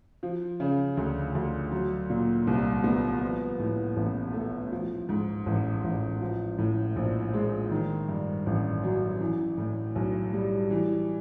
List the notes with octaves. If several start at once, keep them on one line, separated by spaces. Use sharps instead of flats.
F3
C#3
D2
D2
F#3
A#2
C2
B3
F3
A2
A1
A3
F3
G#2
A1
A1
F3
A2
A#1
G#3
D#3
G2
A1
F#3
E3
A2
B1
G3
E3